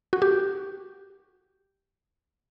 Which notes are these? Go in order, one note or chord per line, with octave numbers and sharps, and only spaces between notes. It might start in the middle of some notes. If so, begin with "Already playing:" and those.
F#4
G4